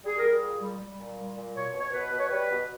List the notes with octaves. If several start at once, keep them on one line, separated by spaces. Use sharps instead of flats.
G3 G#4
G3 A#4
G#4
A#2
G3
G3
A#2
G3
A#2
B2 C#5
B2
C#5
B2 B4
B2
C#5
G3 B4
B2